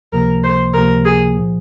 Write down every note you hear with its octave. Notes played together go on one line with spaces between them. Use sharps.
C#2 C3 F3 A#3 A#4
C5
C#2 C3 F3 A#3 A#4
G#4
A#2 F3